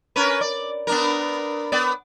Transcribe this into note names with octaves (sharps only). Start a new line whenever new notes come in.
C#4 A#4 B4
D5
B3 D4 A#4
B3 D5